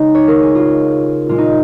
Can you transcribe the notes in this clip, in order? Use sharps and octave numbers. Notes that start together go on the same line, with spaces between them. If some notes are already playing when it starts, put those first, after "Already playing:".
Already playing: C#3 G#3 D#4
C#5
A#4
G#4
F4
A#2 G#3 F4
D#4